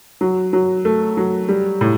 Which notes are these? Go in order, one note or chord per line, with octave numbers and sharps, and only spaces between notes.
F#3
F#3
A3
F#3
G3
A2